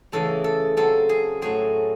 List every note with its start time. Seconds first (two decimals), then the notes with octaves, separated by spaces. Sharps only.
0.12 E2 C#3 E3 A3 A4
0.44 A4
0.77 C#3 F#3 C4 A4
1.09 G#4
1.42 A2 F#3 A3 C4 G#4